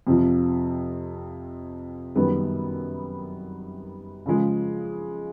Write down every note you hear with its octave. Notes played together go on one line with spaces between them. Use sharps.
F2 C3 F3
F#2 D#3 G3 B3
C#3 F3 G#3